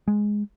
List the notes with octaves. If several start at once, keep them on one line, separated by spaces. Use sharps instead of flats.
G#3